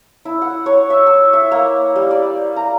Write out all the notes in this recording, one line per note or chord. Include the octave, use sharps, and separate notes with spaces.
E4
F#5
C#5
E5
E6
E5
A#3
G3
D5
A#5